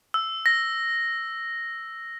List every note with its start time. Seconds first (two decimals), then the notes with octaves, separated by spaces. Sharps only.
0.14 E6
0.46 A#6